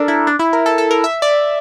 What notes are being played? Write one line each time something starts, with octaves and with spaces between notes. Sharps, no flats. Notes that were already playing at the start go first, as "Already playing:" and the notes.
Already playing: D4 A4 A#4
E4
D4
E4
A#4
A4
A4
A#4
E5
D5